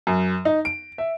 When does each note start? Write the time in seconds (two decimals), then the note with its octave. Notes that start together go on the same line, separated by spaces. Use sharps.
0.07 F#2
0.45 D#4
0.65 D7
0.98 E5